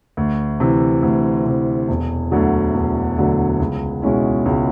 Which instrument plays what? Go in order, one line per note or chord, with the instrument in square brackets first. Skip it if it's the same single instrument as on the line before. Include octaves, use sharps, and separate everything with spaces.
[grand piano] D2
C3 E3
D2
C3 E3
E1
D2 D3 F#3
E1
D2 D3 F#3
C#2
B2 G#3 C#4 E4
C#2